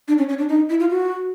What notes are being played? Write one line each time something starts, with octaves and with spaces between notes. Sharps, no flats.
D4
C#4
C#4
D4
D#4
E4
F4
F#4